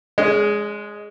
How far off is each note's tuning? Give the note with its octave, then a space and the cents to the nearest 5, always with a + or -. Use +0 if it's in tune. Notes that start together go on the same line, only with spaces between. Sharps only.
G#3 +0 C#4 +45